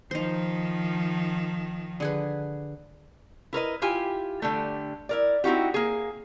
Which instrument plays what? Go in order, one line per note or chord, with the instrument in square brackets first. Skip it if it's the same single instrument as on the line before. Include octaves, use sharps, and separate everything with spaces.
[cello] D#3 F3 [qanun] D#4 C5
[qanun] D3 G#4 B4
[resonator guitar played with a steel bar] E4 A#4 B4 D#5
E4 F4 G4 G#5
D3 G3 A3
E4 A#4 D5
C4 D#4 E4 F#4 G4
A#3 G#4